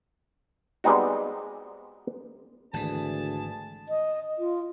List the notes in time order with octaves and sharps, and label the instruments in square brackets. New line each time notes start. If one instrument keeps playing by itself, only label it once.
[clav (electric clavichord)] G3 G#3 B3 C4 D#4 F#4
[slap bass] G#1 E3 [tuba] D2 [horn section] G#4 A5
[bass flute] D#5
F4